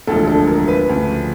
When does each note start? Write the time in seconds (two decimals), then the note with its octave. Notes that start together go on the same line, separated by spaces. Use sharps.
0.07 E1 D2 D3 F3 A4
0.28 A4
0.47 A#4
0.68 B4
0.88 D2 C#3 F3